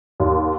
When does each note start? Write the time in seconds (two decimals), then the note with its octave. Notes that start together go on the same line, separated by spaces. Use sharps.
0.20 D#2